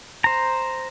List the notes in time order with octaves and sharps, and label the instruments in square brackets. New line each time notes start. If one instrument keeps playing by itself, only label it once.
[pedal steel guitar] C5 A#5